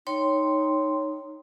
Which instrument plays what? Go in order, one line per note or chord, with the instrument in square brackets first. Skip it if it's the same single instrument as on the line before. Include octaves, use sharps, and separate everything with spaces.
[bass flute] D#4 [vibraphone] C#5 G5 C6